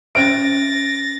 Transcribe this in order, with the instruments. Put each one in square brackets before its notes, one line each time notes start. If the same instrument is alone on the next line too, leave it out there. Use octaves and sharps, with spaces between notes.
[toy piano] C#4 C5 E5 [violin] A6 A#6 [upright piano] D7